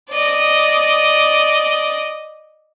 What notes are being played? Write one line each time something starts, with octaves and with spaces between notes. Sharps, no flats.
D5 D#5